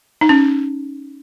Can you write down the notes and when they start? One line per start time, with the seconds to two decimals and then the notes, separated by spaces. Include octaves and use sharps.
0.21 D#4
0.29 C#4